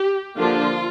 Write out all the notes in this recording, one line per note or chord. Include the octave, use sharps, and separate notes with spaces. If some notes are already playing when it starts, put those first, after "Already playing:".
Already playing: G4
D3 F3 A#3 D4 F4